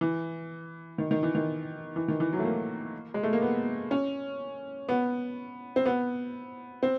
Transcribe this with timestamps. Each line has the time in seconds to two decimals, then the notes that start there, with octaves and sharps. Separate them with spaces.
0.01 E3
0.98 D#3
1.11 D#3
1.23 E3
1.35 D#3
1.96 E3
2.08 D#3
2.20 E3
2.33 F#3
2.39 A3
2.45 A#3
3.14 G#3
3.23 A3
3.33 A#3
3.42 B3
3.91 C#4
4.89 B3
5.76 C4
5.86 B3
6.83 C4